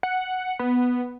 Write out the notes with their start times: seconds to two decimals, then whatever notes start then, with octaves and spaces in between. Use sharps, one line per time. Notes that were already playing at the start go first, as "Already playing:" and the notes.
0.03 F#5
0.59 B3